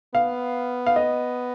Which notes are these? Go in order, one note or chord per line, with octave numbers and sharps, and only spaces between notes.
B3 F5
F5
D#5